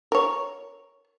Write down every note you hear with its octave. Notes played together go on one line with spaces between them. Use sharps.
A#4 C#5